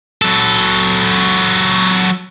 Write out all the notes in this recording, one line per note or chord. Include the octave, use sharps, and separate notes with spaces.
F#3 A4